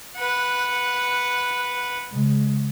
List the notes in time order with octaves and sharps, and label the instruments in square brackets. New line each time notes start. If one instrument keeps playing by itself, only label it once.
[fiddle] B4 F#5
[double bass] C#3 G#3